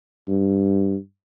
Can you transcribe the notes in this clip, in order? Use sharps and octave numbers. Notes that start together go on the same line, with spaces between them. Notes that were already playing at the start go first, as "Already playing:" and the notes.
G2